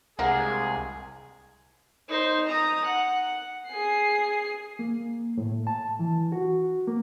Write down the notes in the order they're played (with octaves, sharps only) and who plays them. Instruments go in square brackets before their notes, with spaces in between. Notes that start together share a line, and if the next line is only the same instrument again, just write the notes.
[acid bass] C2 [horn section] G#3 G#4 [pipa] A#3 D4 A#4 [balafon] F#5
[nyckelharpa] D#4 C5
A#5 D#6
F#5
[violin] G#4 C7
[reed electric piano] A#3
A2
A5
E3
F#4
A#3